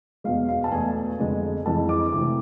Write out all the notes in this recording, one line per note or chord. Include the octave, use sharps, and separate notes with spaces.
E2 B2 G#3 F5
F5
A5
E2 B2 A3 G#5
F2 D3 G#3
F2 E3 G#3 A5
D6
D2 C3 E3 D6